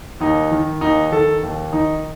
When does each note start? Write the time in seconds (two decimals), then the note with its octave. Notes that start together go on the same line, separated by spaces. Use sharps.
0.20 D#2 D#4
0.51 D#3
0.81 D#2 D#4
1.12 D#3 A4
1.43 D#2
1.73 D#3 D#4